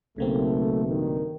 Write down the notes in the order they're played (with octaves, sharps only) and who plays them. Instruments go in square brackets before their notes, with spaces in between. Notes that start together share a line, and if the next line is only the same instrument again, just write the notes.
[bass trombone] B1 [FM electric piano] C#3 A#3 C4 [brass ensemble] A3
[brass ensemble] G2 D#3